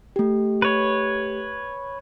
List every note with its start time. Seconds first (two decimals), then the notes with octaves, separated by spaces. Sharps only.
0.16 A3 G4
0.62 B4 C#5